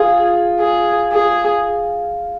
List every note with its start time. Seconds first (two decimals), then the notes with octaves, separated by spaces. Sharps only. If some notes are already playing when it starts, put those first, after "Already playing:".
Already playing: F4 G#4
0.59 G#4
1.12 G#4